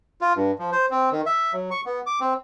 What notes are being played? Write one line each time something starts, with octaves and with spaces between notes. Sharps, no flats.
F4
G2
F3
C5
C4
D#3
E5
F#3
C#6
B3
D6
C4